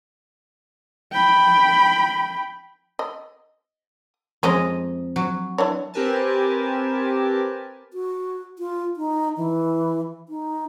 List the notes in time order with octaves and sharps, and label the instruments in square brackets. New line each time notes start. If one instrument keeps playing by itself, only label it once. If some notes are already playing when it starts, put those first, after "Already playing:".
[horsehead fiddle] G5 B5
[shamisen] D#5
[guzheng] F2 D#5 A#5 [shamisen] G#3 C#4 C#5
[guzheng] F#3
[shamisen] E3 D4 C#5
[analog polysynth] C4 G4 A#4 B4 G#5 A5
[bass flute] F#4
F4
D#4
E3
D#4